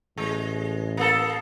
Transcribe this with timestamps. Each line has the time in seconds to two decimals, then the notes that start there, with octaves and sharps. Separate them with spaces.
0.18 A1 G#3
0.97 A#3 A4